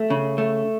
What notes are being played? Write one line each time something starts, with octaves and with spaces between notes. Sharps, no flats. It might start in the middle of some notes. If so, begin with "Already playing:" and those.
Already playing: A3
C#3
A3